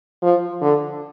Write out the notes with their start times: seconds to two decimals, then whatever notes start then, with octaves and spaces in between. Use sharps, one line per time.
0.22 F3
0.61 D3